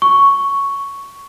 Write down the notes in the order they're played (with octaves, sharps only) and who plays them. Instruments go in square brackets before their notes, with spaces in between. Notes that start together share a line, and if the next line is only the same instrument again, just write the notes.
[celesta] C#6